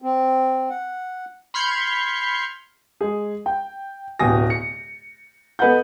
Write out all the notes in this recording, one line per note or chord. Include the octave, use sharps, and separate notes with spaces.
C4
F#5
B5 C6 F6 G6 G#6 C#7
G#3 G#4
G5
D1 B2 G4 G#5 D#6 A#6
C#7
B3 A4 B4 D#5 F#5 G6